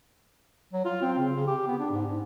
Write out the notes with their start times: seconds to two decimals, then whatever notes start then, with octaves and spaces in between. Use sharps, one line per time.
0.73 F#3
0.85 F4
1.02 C4
1.18 C#3
1.35 C#3
1.47 G4
1.67 B3
1.79 D4
1.91 G#2
2.07 G#2